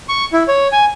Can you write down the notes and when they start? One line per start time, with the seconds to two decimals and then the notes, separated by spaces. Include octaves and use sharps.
0.09 C#6
0.33 E4
0.48 C#5
0.72 G#5